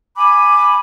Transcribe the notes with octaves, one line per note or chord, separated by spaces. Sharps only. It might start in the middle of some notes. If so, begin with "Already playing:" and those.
G#5 B5 D6